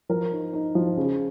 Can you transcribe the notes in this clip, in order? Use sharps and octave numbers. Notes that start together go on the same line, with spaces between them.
F3 A#4
D#4
D#4
F3
C#3